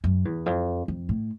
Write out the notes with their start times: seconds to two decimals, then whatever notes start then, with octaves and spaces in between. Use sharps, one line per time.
0.04 F#2
0.25 E2
0.46 F2
0.88 F2
1.09 A2